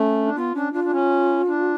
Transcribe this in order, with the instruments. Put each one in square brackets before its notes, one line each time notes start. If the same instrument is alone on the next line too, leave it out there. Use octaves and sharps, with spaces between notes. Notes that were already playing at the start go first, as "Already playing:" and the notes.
Already playing: [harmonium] A3 [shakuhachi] C#4
[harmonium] D4
[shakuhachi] B3 [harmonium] F4
[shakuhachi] C#4 [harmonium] D4
[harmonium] D4 [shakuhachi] F4
[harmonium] D4
C#4
D4